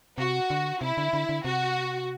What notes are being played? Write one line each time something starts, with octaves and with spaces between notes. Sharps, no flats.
C3 F#4
D3
C3 E4
D3
D3
D3
C3 F#4